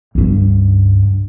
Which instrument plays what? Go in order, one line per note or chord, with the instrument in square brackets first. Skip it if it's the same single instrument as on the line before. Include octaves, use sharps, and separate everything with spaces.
[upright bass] C#2 G2